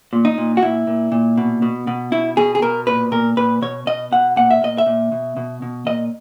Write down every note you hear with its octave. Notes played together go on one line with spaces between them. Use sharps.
A#2
D#4
A#2
F#4
A#2 E4
A#2
A#2
B2
B2
B2
B2 E4
B2 G#4
G#4
B2 A#4
A#2 B4
A#2 A#4
A#2 B4
B2 C#5
B2 D#5
B2 F#5
A#2 F#5
E5
A#2 D#5
E5
A#2
B2
B2
B2
A#2 D#5